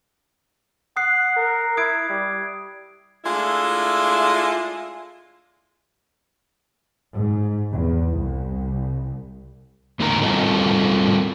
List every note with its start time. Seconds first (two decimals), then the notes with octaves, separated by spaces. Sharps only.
0.97 F#5 D#6 F#6 C7
1.36 A#4
1.77 E4 D#6 G#6 D7
2.09 G3
3.25 G#3 A3 D4 E4 F4
7.13 G#2
7.71 E2
8.18 C2
10.00 E2 A2 D3 E4 A#4 A#5
10.21 G3 C4 F4 A4 A#4 D#5